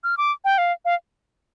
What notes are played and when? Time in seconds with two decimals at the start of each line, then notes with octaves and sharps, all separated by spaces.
0.04 F6
0.18 D6
0.45 G5
0.58 F5
0.85 F5